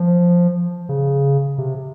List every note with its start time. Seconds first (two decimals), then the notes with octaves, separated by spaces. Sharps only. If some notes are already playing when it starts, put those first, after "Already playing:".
Already playing: F3
0.89 C#3
1.58 C3